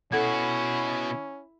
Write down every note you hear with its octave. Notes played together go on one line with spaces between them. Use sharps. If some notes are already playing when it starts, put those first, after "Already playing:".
B2 C#4 E4 F#4 A4 F#5 G#6